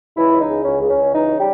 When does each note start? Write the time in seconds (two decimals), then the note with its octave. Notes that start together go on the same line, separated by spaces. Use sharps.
0.17 C#2 E3 E4
0.32 C#2
0.41 D#4
0.50 C#3
0.65 C#2 C#4
0.81 C#2
0.90 C#4
0.98 C#2
1.14 E3 D#4
1.30 C#3
1.38 G3 G4